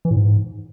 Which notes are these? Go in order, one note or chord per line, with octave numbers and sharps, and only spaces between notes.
E3
A2
G#2